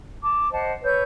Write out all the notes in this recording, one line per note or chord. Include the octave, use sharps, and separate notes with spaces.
A5 D6
C5 D#5 F#5 A5
B4 C#5 E6 G6